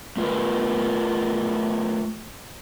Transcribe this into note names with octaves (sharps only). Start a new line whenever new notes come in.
A3 F4 A#4 B4